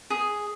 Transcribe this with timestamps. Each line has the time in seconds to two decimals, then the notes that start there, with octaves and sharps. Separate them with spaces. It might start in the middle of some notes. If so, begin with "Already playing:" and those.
0.10 G#4